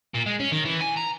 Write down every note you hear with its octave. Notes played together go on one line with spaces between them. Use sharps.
A#2
G#3
C#4
D#3
E3
G#5
A#5